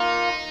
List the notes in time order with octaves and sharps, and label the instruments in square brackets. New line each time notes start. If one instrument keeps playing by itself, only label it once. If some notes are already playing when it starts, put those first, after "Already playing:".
Already playing: [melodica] A#3 F4 A#4 [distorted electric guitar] D#4